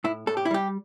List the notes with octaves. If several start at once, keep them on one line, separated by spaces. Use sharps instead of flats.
A2 E4
A2 A4
G4
E4
G3 G4